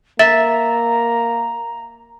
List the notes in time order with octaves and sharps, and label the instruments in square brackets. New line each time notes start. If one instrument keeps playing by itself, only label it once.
[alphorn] A#3 [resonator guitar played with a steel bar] E5 [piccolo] A#5 [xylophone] A6